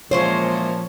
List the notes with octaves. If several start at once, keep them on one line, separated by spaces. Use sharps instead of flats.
A#2 E3 F3 G#3 C5 C#5